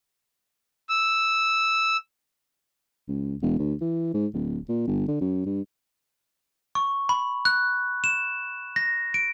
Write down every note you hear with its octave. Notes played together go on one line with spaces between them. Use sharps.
E6
C#2
E1
D2
E3
G#2
D1
A#2
G1
D3
F#2
G2
C#6
B5
F#6
E7
A#6
D7